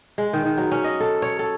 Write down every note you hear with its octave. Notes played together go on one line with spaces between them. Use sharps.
G#3
D#3
D#3
F#3
C#4
D#5
A4
C#5
A4